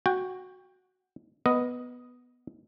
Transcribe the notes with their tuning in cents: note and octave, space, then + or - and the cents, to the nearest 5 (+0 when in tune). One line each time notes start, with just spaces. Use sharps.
F#4 +0 G5 +15
B3 +0 A#4 +40 D#5 +0